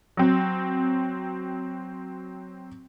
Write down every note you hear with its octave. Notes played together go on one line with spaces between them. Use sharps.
F#3 C4